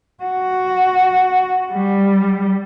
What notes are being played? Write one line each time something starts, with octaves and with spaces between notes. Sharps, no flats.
F#4
G3